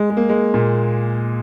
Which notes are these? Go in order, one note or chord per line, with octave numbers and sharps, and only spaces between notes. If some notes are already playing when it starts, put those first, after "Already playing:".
Already playing: G#3
G#3
A#3
G#3
A#2